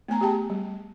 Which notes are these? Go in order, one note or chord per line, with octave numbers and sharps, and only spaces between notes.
A3 B3 G#5 A#5
G4 G#4 G5 A5
G3